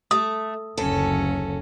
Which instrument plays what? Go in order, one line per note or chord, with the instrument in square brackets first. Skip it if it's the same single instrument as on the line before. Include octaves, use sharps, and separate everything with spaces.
[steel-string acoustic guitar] A3 [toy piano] D#6
[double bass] F#1 D2 [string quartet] F#3 C#4 [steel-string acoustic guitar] A4